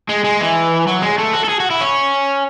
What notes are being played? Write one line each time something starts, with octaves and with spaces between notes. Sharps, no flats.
G#3
G#3
E3
F#3
G#3
A3
F#4
A4
G#4
F#4
E4
C#4